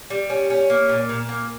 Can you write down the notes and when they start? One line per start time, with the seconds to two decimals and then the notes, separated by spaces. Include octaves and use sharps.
0.10 G3
0.30 C#4
0.50 C#4
0.70 A#3
0.89 A#2
1.09 A#2
1.29 A#3